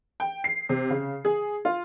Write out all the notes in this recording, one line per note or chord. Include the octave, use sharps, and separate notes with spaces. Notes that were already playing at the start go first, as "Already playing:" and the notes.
G5
C7
C3
C#3
G#4
F4